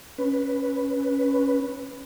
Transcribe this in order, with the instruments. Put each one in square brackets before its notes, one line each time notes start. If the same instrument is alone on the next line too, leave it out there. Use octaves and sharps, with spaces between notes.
[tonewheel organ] C#4 B4